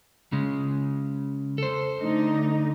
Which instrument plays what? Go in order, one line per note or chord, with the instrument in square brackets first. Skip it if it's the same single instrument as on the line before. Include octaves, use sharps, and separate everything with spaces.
[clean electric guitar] C#3 G#3
A4 C5
[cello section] D3 A3 D#4